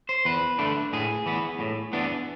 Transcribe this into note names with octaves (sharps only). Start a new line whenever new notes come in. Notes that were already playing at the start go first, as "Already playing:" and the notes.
C5
E2 B4
D3 A3 D4
A2 G#4
E3 B3
A2
E3 B3 D4